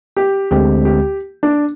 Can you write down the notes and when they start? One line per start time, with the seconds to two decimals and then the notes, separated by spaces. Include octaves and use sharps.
0.17 G4
0.51 D2 D3 G#3 C4 G4
0.85 G4
1.43 D4